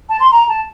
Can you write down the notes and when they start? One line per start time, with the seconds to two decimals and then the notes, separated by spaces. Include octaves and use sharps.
0.09 A5
0.20 C6
0.32 A#5
0.49 A5